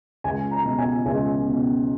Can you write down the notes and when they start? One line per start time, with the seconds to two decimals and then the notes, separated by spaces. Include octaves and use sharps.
0.24 C#2 G#5
0.51 A#5
0.65 B2
0.78 G#5
1.06 C#2 G#5
1.46 B2